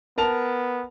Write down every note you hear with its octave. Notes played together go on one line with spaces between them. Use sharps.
B3 A#4 A5 F7